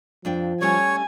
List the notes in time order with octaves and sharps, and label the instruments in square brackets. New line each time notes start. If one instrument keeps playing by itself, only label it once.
[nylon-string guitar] F2 D4 G5 [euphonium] F3
[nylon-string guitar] G3 A3 C#4 [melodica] C#5 [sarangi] G#5